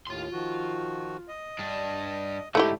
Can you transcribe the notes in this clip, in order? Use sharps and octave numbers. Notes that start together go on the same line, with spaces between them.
D#2 A2 F4 C6
D#3 F3 F#4
D#5
G2 D4
G#2 D3 A3 E4 G4